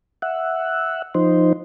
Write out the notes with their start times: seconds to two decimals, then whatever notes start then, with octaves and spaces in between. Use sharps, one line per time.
0.22 E5 F#5
1.15 F3 D#4 C5